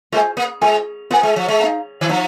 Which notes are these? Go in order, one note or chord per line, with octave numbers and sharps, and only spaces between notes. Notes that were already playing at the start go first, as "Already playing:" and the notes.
G#3 F4 C5 G#5
A#3
G#3 F4 C5 G#5
A#3 F4 C5 G#5
G#3
F3
G#3
D#4 C5 F5 A#5
D#3
F3 D#4 C5 F5 A#5